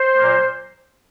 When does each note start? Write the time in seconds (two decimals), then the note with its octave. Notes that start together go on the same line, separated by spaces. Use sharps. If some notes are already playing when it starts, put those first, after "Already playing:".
Already playing: C5
0.17 A#2 F#3 A#3